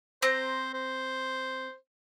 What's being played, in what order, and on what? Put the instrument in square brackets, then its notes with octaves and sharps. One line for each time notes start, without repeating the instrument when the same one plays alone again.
[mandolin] C4 A#5 [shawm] C5
[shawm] C5